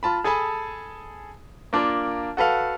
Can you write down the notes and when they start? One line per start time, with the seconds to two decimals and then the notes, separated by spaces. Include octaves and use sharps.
0.03 F4 A5 B5
0.24 G#4 A4 G#5 A5 B5
1.73 A#3 D4 F4 A#4
2.37 F#4 A4 B4 F5